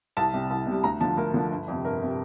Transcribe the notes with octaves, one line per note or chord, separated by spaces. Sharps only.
C2 A5
C3 G3
C2
C3 G3
D2 A#5
D3 F3 A5
D2 A#4
D3 F3
G1
F2 C3
G1 A#4
C3